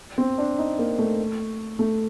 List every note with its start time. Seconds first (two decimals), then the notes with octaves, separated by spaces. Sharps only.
0.18 C4
0.38 D4
0.59 D#4
0.79 A#3
0.99 A3
1.79 A3